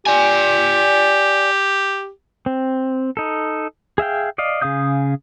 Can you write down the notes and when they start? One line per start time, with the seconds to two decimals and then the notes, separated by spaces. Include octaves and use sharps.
0.06 G4 D5 G#5
2.46 C4
3.17 D#4 A4
3.98 G#4 E5 F5 G5
4.38 D5 D#5 F5
4.62 C#3 G#4 F5 D#6 G6